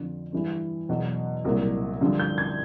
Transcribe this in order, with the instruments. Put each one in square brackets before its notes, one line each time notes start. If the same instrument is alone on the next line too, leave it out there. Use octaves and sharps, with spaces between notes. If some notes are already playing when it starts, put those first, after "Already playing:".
Already playing: [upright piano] F2 D3 F3
G2 E3
E2 B2 F#3
C2 A#2 F#3
G2 D3 F3
G6
G#6